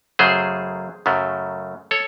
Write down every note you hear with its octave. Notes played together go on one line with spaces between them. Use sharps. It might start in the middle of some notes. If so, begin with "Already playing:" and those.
F#2 C#3 F#3 A3 G#4 C5
F#2 C#3 F#3 A3
A4 C#5